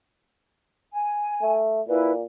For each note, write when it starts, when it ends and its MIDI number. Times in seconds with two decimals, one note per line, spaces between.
0.94 1.57 80
1.42 1.81 57
1.88 2.25 46
1.88 2.11 64
1.88 2.11 71